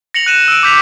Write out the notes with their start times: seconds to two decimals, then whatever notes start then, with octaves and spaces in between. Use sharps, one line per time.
0.14 A#6 C#7 F7 F#7
0.26 F#6 D#7 E7
0.48 E6 D7
0.63 D6 G6 B6 F7